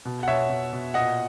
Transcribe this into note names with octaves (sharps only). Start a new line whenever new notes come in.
B2
F#5
B2 C#5 E5
B2
B2
A#2 D#5 F#5